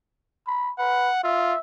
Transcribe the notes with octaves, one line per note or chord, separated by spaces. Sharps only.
B5
B4 F#5
F4 E5